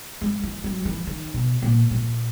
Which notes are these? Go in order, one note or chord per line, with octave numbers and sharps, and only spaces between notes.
G#3
E3
F#3
E3
D#3
B2
A#2
A#2